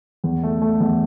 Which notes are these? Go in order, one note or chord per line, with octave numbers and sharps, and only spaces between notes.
E2
A3
A3
E2